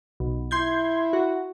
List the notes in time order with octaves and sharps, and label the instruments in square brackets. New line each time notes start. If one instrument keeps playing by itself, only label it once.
[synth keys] B1
[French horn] E4 [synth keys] C6 G6 G#6
[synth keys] F#4